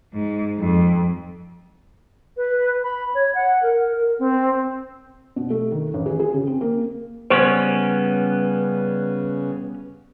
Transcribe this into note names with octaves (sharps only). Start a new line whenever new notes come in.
G#2
F2
B4
B5
C#5
F#5
A#4
A#4
C4
B2
A3
D#3
A1
G#4
G#4
C#3
C4
A#3
C#3 G3 B3 C#4 B4 C5 C#6